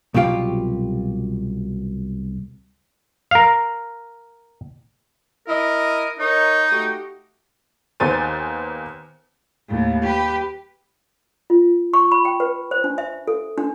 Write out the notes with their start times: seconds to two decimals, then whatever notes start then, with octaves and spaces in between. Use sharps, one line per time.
0.14 C2 B2 F#3 F4 G4 F5
3.31 A#4 F5
5.47 E4 A#4 D#5
6.19 D#4 A#4 C#5 D#5
6.70 A3 F#4 G4
8.00 D#2 B3 C5 G#5 A6 D#7
9.68 D#2 A2
10.03 G4 B4
11.50 F4
11.94 C#6
12.12 B5
12.25 G5
12.40 B4
12.71 C5
12.84 D4
12.98 E5
13.28 A4
13.58 D4